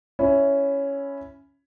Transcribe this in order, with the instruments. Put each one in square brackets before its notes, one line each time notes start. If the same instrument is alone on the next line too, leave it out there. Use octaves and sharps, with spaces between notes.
[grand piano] C#4 E4